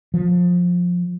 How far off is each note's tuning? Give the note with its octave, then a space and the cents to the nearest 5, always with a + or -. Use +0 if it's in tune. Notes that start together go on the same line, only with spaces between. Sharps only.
F3 +20